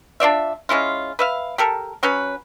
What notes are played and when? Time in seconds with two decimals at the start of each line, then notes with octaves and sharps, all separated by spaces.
0.20 D4 F4 D5 E5
0.69 G#3 C#4 E4 F4
1.19 B4 E5 F5
1.58 G4 A4 A#4
2.03 F#3 C#4 B4